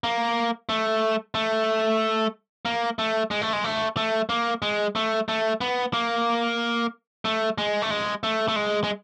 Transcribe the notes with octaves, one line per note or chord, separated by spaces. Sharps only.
A#3
A3
A3
A#3
A3
G#3
A3
G#3
A3
A3
A#3
G#3
A3
A3
B3
A#3
A3
G#3
A3
G#3
A3
A3
G#3
G#3